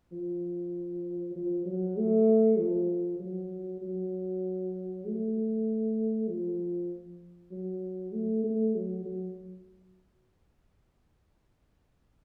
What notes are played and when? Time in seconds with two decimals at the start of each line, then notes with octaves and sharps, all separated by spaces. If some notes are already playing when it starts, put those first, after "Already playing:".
0.12 F3
1.36 F3
1.66 F#3
1.97 A3
2.58 F3
3.20 F#3
3.82 F#3
5.05 A3
6.28 F3
7.51 F#3
8.12 A3
8.44 A3
8.75 F#3
9.05 F#3